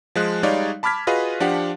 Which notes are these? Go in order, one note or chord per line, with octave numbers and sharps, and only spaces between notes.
F3 G#3 F#6
G3 G#3 D#4 C#5 D5 F5
A5 B5 D6 F6 G#6 B6
F4 F#4 G#4 B4 D#5 F5
F3 D4 G4 F5 F#5